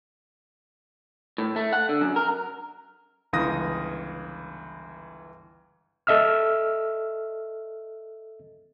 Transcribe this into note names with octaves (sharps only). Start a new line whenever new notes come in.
A2
A3
F#5
D3
F#2
A#4
G1 C#2 E3 F5 D#6 A#6
A4 D#5 E5 E6 F6